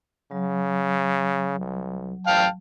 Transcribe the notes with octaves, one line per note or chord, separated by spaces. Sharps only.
C#3 F#3
C2
A1 F5 G5 A5